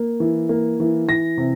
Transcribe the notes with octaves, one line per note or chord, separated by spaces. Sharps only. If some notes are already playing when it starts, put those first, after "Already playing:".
Already playing: A#3
E3
A#3
E3
E3 A#6
C3